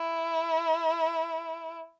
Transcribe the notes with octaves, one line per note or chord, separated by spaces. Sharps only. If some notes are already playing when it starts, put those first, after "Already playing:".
Already playing: E4